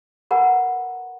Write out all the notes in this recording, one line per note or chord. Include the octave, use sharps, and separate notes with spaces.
A#4 B4 F#5 G#5 A#5 B5